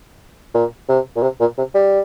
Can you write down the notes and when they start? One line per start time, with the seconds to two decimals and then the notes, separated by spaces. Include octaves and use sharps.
0.54 A#2
0.88 C3
1.16 A#2
1.22 C3
1.40 A#2
1.57 C3
1.74 G3